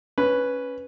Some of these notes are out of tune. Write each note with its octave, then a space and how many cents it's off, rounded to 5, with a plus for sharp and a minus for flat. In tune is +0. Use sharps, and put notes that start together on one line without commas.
C#4 +0 B4 +0